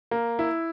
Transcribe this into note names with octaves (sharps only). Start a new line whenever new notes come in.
A#3
E4